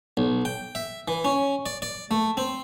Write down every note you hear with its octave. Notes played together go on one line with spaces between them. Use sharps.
B1
G5
E5
E3
C#4
D5
D5
A3
C4